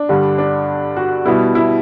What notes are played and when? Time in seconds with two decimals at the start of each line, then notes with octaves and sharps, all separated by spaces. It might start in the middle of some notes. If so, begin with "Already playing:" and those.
Already playing: D4
0.09 G2 D3 G3
0.38 D4
0.96 F#4
1.25 B2 G3 B3 E4
1.55 E4